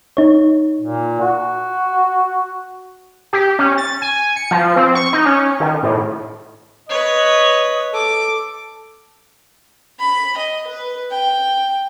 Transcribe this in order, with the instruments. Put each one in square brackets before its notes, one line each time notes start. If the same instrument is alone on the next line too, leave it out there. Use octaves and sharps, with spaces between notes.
[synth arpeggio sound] D#4 C#5
[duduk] A#2
F#4
[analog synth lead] G4
C#4
A6
G#5
C#7
F3
C4
C#6
D#4
C#4
D#3
A2
[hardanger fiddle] B4 C#5 [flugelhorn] D#5
[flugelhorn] A4 [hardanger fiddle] D6
[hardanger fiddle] B5
D#5
B4
G5